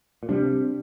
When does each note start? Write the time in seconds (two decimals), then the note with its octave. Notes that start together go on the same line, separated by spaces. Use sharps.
0.23 A#2
0.29 C3 G3 D4